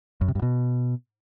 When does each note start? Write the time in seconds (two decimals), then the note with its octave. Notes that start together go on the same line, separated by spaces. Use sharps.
0.21 F#2
0.28 C3
0.35 G2
0.42 B2